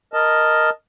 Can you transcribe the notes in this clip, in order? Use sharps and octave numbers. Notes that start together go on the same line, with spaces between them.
A#4 D#5 A5